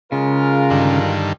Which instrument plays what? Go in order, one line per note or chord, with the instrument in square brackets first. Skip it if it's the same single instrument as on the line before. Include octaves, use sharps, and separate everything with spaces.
[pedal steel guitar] C#3 [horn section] G#3 F4 A#4
[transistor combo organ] G2 D3 D#3